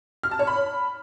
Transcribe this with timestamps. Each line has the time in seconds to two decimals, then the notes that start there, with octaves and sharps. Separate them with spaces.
0.23 F6
0.31 A5
0.39 C#5
0.47 B5